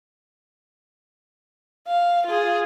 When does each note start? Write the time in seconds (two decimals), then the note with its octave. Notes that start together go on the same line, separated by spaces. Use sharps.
1.87 F5
2.26 F4 G#4